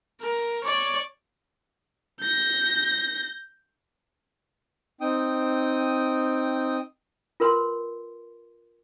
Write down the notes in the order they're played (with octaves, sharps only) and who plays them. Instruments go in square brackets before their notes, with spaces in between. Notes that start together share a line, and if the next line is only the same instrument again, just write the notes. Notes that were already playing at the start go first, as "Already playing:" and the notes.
[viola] A#4
C#5 D5
[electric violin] G6 A#6
[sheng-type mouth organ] C4 D#4 G5 D#6
[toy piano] F4 A#4 B4 C6